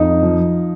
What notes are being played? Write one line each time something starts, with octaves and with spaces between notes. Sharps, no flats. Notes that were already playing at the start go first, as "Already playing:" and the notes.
Already playing: F2 D#4
F3